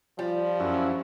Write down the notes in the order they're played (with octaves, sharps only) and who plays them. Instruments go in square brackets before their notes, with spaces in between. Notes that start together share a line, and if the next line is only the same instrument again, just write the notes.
[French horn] F3 [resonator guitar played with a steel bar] G3 [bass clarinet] F4
[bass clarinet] F#2 [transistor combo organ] F#3 C#4 E4